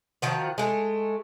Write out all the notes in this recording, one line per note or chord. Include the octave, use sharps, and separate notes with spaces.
D#3 F3 F#4
G#3 A3